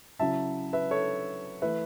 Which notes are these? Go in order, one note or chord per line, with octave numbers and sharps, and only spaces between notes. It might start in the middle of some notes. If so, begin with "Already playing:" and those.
C#3 F#3 C#4 E4 E5 A5
B4 E5
A4 C#5
E3 A3 B4 E5